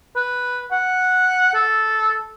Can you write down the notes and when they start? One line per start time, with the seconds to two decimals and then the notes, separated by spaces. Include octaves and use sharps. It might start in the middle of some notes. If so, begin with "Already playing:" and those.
0.16 B4
0.72 F#5
1.54 A4